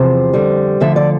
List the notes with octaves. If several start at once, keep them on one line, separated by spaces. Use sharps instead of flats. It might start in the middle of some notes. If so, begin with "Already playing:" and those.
Already playing: E2 C3 F3 C5
F2 D3 G3
D2 D3 F3 E5
D5